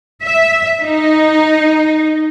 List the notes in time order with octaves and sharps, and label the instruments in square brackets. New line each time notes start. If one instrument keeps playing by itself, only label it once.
[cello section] E5
D#4